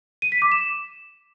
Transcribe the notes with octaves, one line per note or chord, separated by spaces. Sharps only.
D#7
B6
D6
E7